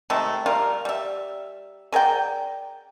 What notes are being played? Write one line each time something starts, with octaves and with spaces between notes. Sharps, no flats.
C3 D#3 G#3 A3
G3 F4 A#4
G3 E5
G#4 A#4 D5 G5